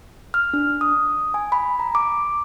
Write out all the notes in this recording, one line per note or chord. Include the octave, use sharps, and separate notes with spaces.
F6
D4
D#6
G#5
B5
A#5
D6